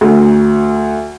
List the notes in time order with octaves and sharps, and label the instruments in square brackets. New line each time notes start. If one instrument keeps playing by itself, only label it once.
[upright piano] D2